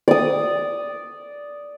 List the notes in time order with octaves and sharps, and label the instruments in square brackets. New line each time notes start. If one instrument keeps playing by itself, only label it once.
[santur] D5 D#6